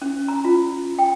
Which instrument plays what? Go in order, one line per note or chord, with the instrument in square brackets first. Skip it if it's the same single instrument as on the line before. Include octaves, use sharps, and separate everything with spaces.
[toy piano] C#4
A#5
F4
G5